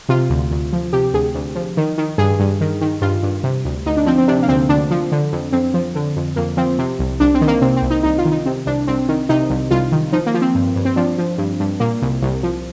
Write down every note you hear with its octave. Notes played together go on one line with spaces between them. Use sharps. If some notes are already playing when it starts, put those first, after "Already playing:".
C3 F4
D2
D2
F3
C3 G4
D2 G#4
D2
F3
D#3
D#3
G2 G#4
G2
D#3
D#3
G2 F4
G2
C3
D2
D2 D#4
D4
F3 C4
C4
C3 D4
A#3
D2 C4
D2 D4
F3
D3
F2
F2 C4
F3
D3
F2
F2 A#3
F3 C4
C3
C2
C2 D4
C4
D#3
A#3
C3 C4
C4
C2
D#4
C2 D#4
F4
D#3
D#4
C3 C4
C2 D4
C2 C4
D#3
C3 D#4
C2
C2 F4
D#3
F3 D#4
A#3
F3
C4
G2
G2
C4
F3 D4
F3
G2
G2
A#2 A#3
C2
C2
F3